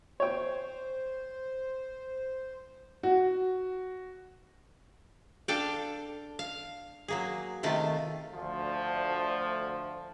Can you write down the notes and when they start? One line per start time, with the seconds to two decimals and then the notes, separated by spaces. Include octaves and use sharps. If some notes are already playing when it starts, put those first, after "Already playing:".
0.20 C5 C#5 G5
3.03 F#4
5.48 D4 A4 F5 G5
6.39 F5
7.08 F#3 A#3 G#4
7.63 C3 D#3 A3 F4
8.33 D2 F3